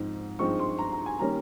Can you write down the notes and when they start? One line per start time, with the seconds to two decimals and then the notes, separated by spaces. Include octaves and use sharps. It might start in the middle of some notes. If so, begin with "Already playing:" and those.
Already playing: G#2 F3 C4 D#4
0.39 G2 F3 G#3 C4 D#4 C#6
0.59 C6
0.79 A#5
0.92 A#5
1.06 G#5
1.19 D#3 G3 A#3 C#4 A#5